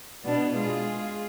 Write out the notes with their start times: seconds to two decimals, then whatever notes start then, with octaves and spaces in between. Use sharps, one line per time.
0.24 B2 B3 D4
0.56 G#3 F4 G#4